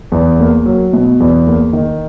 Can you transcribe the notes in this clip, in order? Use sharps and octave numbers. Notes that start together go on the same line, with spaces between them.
E2
A#3
F#3
B2
E2
A#3
D#3